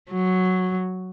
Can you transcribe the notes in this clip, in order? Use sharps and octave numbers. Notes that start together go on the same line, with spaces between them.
F#3